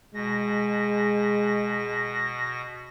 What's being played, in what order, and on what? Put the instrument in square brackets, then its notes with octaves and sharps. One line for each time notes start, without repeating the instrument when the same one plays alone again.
[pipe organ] B2 A#6 [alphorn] G#3